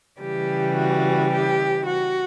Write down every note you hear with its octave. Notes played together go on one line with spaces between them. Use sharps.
C#3 E3 G3 G4
F#4
G4
F#4